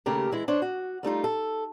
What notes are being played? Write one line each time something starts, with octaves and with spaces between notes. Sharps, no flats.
D#2 C#3 A3 G4 A#4
E3 G#3 E4
D4 C5 C#5
F#4
G3 A3 D#4 F4
A4